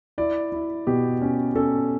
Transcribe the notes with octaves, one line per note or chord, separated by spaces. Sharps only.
E4 D5
E4
B2 G4
C#4
C#4 A4